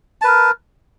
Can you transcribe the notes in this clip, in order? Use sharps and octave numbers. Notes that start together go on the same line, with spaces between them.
A#4 B4 A5